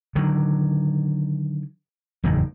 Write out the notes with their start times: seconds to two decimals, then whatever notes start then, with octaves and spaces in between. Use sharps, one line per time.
0.15 D3 D#3 F#3
2.24 F#1 E2 A2 D#3